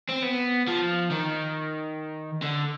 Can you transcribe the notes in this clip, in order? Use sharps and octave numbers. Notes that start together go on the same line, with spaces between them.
C4
B3
F3
D#3
D3